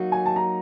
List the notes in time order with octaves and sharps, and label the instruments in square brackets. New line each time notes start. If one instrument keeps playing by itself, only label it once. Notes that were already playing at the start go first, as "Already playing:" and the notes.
Already playing: [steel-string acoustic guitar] F#3 A#3 D#4 F#4
[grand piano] G#5
A5
A#5